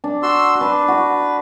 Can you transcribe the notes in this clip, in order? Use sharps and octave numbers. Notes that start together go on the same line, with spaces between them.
D4
F#4 C6 E6
D4 B4
F#4